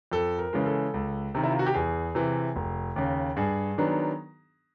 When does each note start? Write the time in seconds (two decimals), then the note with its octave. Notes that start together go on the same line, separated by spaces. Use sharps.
0.12 F2 A4
0.39 A#4
0.53 C#3 E3 G#3
0.66 A4
0.94 C#2
1.35 C3 D#3
1.44 E4
1.52 F4
1.59 F#4
1.66 G4
1.74 E2 G#4
2.15 C3 E3
2.56 F1
2.96 D#2 C#3
3.37 G2 G#4
3.78 D#3 F#3 B3 D4